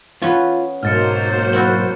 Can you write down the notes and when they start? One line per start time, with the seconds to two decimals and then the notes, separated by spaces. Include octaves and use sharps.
0.22 B3 C#4 F4
0.83 B1 G#2 F#3 A#3 C5 F6 A6 C#7
1.53 C4 E4 F#4